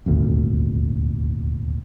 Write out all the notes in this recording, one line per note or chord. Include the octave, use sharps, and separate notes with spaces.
D#1 G#1 D2